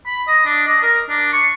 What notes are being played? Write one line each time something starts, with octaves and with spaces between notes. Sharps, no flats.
B5
D#5
D4
D#5
A#4
D4
C#6